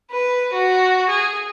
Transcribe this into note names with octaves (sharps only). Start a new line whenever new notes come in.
B4
F#4
G#4